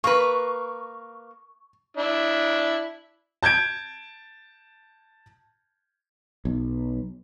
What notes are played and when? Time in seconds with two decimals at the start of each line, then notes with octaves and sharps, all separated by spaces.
0.04 A#3 B4 C#6
1.97 D4 E4
3.43 A5 G6 G#6 D7
6.45 B1